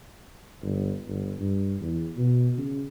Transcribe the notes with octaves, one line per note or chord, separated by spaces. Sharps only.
G1
G1
G2
E2
B2
C#3